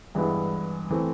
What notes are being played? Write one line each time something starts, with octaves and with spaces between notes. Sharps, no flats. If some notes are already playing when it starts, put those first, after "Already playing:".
G2 E3 G#3 B3 E4
E3 A3 C4